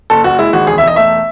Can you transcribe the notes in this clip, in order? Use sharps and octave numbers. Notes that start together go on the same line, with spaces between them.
F#1 A4
F#1 F#4
G#3 E4
G#1 F#4
E1 G#4
E5
E1 D#5
A3 E5